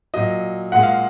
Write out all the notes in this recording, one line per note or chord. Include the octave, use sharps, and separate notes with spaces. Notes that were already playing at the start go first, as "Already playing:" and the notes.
A#2 F#3 D#5
A#2 G#3 F#5
F5